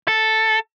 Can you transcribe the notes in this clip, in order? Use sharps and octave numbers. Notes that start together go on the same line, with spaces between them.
A4